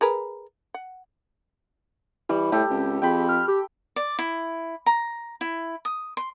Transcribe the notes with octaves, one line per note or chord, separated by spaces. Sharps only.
G#4 A#4 B4
F#5
E3 G3
A2 G4 A4
C#2 C4
F2 G#4 G5 B5
F6
G4
D5
E4
A#5
E4
D#6
C6